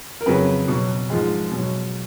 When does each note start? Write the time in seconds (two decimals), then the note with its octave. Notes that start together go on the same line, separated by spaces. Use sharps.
0.21 A#4
0.26 F2 C#3 F#3 B4
0.68 B2 F#3
1.10 G#2 F3 G#3
1.52 B2 F#3